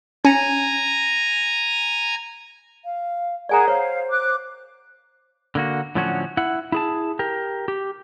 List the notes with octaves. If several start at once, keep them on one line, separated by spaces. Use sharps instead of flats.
C#4 G#5 A#5
F5
G#4 A#4 D5 F#5 G#5 A#5
C5 C#5 F5
D6 F#6
D3 A#3 F#4
A2 D3 F3 F#3 C#4 F#4
E4 F#5
E4 G#4 A5
G4 A#4
G4